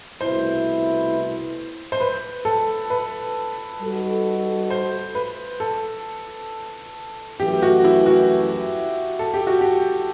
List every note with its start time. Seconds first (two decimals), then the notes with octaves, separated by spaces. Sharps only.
0.20 C2 B2 A3 E4 B4 C5
1.92 C5
2.01 B4
2.45 A4
2.90 B4
3.81 G3 D#4 F#4 A4
4.70 C5
5.15 B4
5.60 A4
7.39 F#2 E3 A3 G4
7.62 F#4
7.84 E4
8.06 F#4
9.19 A4
9.34 G4
9.47 F#4
9.61 G4